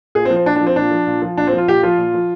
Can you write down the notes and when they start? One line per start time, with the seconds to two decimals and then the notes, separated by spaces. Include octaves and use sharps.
0.15 A#2 G#4
0.25 C4
0.30 F3
0.36 C4
0.45 A#2 D4
0.56 D4
0.61 F3
0.67 C4
0.76 A#2 D4
0.91 F3
1.07 A#2
1.22 F3
1.37 A#2 D4
1.47 C4
1.53 F3
1.58 F4
1.67 A#2 G4
1.83 F3 F4
1.98 A#2
2.14 F3